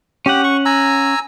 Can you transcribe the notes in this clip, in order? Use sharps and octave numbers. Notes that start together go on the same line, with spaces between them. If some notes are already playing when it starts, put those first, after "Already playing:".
C#4 G4 F#5
C#6
G#5 A#5 E6